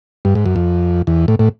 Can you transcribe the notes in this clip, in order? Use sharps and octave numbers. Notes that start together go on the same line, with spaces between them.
G2
G#2
F#2
F2
E2
A2
A2